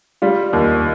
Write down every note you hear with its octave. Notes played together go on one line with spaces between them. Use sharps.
G3 F4
D#2